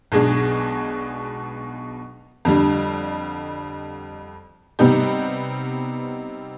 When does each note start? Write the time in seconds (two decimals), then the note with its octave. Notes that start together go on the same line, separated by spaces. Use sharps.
0.12 B1 B2 G#3 D4 G#4
2.45 F2 D3 G3
4.79 C3 G3 B3 D#4 G4